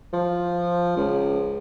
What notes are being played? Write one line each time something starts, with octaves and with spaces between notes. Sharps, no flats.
F3
C#2